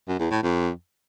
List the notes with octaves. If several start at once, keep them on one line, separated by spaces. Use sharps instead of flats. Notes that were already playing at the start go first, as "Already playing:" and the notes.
F#2
E2
A2
F2